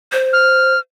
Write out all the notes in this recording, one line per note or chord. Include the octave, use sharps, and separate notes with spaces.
C5
F6